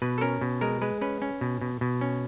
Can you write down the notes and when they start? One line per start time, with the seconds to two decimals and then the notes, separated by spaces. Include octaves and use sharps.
0.02 B2 B4
0.18 A4
0.21 C#4 A#4
0.41 B2
0.61 G#3 A#4
0.82 G#3 B4
1.01 C#4 B4
1.22 C#4
1.41 B2
1.61 B2
1.81 B2
2.01 C#4